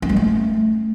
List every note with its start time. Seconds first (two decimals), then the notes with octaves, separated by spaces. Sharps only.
0.02 C#4
0.09 G#3
0.16 A3